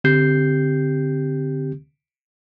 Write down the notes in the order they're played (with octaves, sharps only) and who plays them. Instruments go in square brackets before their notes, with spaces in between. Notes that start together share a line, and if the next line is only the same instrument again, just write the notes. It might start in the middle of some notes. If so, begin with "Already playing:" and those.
[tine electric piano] D3 C4 G4 G6 C7